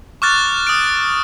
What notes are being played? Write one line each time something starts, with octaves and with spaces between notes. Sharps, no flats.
C#6 D6 F6 F#6 A6
D#6 D7